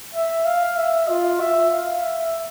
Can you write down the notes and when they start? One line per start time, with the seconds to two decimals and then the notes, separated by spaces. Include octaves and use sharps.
0.14 E5
0.46 F5
0.77 E5
1.09 F4
1.40 E5
1.71 F5
2.03 E5